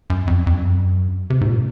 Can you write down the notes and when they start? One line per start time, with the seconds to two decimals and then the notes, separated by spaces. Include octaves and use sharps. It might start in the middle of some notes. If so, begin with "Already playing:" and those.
0.10 F#2
0.27 F2
0.47 F2
0.53 F#2
1.30 C3
1.41 G#2
1.47 A#2